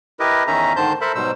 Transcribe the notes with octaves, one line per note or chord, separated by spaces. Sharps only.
E4 G4 A#4 B4 D#5
E2 D#3 C#4 D#4 E5 A#5
G#2 D3 D#3 C5 A5 G6
A4 A#4 C5 E5 A5 B5
G#2 B2 F#3 G3 C5 E6